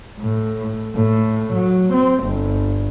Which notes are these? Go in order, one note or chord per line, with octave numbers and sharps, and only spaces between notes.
A2
A2
F#3
C4
G1